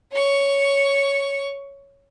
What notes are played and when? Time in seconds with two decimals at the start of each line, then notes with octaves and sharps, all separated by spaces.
0.13 C#5 C#6